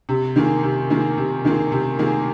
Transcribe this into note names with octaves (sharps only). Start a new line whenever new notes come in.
C3
D#3 A#3 F4 G#4
C3
D#3 A#3 F4 G#4
C3
D#3 A#3 F4 G#4
C3
D#3 A#3 F4 G#4